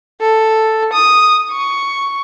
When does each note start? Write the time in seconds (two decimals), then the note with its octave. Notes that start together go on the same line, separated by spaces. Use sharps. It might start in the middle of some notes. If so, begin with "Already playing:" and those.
0.21 A4
0.93 D#6
1.52 C#6